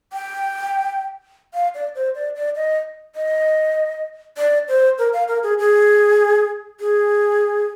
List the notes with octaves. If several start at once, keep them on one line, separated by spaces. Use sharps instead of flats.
G5
F5
D5
C5
D5
D5
D#5
D#5
D5
C5
A#4
F5
A#4
G#4
G#4
G#4